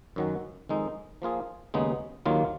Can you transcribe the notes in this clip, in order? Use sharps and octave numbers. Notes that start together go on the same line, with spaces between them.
F#2 D#3 F#3 C#4 F#4
F2 D#3 G#3 D#4
F3 A#3 F4 G#4
D#2 C#3 G#3 B3 D#4
D#2 D#3 F#3 A#3 F4